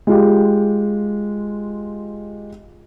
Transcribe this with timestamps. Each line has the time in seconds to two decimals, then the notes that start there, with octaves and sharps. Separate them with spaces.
0.07 G#3 F4 G4